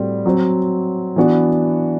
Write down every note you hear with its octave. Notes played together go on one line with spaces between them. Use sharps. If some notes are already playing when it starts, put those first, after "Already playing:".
Already playing: A2 G3 C4 F#4
F#3 C4 F#4 C5
E3 B3 D4 F#4